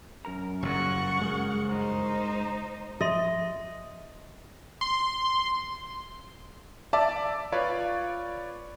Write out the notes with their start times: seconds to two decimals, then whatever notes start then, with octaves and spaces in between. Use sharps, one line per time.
0.25 F#2 A#4 A#5
0.63 F#1 G2 F#3 F#5 C#6
1.21 G#3 G#4 A#4
1.68 D#4 C5
3.01 F3 D#5 E5 C6
4.81 C6
6.93 D5 E5 A5 D6
7.52 F4 B4 C#5 D5